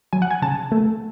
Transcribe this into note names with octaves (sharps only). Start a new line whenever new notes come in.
F#3 G#5
F#5
G#5
C#3 A5
A3